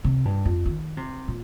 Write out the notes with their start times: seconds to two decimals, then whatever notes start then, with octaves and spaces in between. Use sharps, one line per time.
0.04 C3
0.25 G2
0.45 F2
0.66 D#3
0.97 C3
1.28 A#2